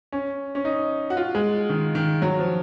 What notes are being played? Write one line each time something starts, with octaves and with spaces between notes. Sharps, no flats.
C#4
C#4
D#4
F#4
F4
G#3
D#3
D#3
F#3
F3